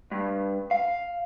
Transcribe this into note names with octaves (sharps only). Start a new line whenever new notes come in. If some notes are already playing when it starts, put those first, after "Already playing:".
G2
F5